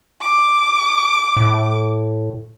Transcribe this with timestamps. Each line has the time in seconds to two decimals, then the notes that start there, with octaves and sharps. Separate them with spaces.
0.21 D6
1.37 A2